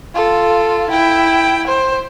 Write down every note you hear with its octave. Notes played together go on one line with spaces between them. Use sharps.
F4 A4
E4 G5
C5